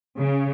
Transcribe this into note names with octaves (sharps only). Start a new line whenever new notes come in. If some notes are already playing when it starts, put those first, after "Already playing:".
C#3